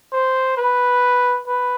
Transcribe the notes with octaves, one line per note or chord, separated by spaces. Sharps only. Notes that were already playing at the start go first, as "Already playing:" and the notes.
C5
B4
B4